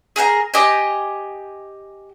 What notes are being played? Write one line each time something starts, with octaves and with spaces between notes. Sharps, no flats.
G#4 A#4 G5 A#5
G4 D#5 G5 G#5